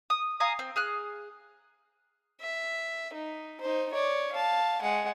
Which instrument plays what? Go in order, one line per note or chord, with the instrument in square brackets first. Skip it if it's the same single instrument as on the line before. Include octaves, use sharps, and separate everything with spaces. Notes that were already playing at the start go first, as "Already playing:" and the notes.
[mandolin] D#6
F5 G#5 A#5 D#6
C4
G#4 F6 F#6
[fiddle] E5
D#4
D#4 C5
C#5 D5
F5 A5
G#3 F#5